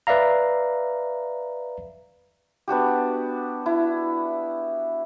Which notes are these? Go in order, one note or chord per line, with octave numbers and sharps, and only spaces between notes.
B4 D5 E5 F5 A#5
B3 D4 F#4 G4
E4